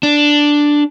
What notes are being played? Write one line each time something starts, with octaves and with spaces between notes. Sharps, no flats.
D4